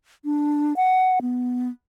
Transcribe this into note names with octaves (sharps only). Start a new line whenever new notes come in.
D4
F#5
B3